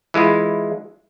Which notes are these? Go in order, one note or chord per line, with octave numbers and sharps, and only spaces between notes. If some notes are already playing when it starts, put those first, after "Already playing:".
E3 G#3 E4 F4